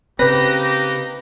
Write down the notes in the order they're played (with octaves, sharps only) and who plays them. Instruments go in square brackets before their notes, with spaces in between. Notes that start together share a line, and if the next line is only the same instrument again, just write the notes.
[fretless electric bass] C#3 C4 [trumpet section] A#3 D#4 G4 [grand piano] B4 [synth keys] A#6